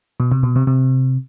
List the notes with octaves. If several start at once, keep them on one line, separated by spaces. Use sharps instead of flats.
B2
C3
B2
C3
C3